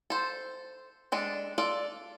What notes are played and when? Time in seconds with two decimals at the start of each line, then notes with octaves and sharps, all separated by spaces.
0.10 A4 C5
1.12 G#3 D4 A4
1.58 F4 A4 D5